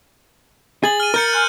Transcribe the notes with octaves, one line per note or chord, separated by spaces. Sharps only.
G#4 A6 F#7
F6 D#7
A#4 A#5 F6 G6 C#7
G#5 C6 F6 F#6